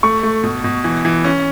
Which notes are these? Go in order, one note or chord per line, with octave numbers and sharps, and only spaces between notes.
A3 C#6
A3
B2
B2
E3
E3
C#4